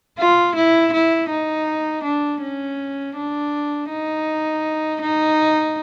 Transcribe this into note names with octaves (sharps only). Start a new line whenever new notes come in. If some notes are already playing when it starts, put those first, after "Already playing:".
F4
E4
E4
D#4
D4
C#4
D4
D#4
D#4